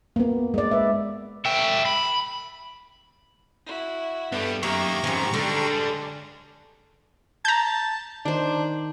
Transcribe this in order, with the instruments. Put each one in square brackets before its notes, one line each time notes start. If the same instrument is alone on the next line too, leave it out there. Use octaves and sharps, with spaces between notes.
[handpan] A#3 B3
G#3 D5
B4 E5
[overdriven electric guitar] E4 G5
B5
[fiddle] E4 F#4
[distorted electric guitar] G2 G3 [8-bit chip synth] B3 [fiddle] A4
[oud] F#2 [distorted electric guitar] D#3 A#3 [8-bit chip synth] G4 A#5 C#6 [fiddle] E5
[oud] F2 C#4 [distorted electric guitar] G#2 D#3 [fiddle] G#3
[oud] D3 [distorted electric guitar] G3 D4
[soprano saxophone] A5 [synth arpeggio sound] A#5 G6
[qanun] D#3 C5 [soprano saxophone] D4